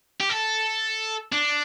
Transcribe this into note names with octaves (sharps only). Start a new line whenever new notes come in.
G4
A4
D4